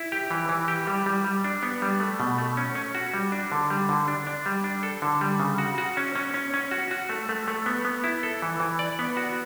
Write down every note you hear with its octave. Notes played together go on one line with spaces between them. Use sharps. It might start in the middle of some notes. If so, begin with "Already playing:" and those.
Already playing: E4
G4
E3
E3
G4
G3
G3
G3
D4
B3
G3
A3
B2
A3
C#4
C#4
F#4
G3
D4
D3
G3
D3
D4
D4
G3
D4
A4
D3
G3
C#3
F#4
F#4
C#4
C#4
C#4
C#4
F#4
F#4
A3
A3
A3
B3
B3
E4
A4
E3
E3
D5
B3
F#4